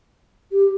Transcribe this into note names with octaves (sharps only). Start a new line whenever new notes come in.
G4